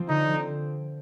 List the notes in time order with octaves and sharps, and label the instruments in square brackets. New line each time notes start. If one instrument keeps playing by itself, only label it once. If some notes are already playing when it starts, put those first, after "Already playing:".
Already playing: [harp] F3 C4
[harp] D3 [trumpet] D#4
[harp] F3 C4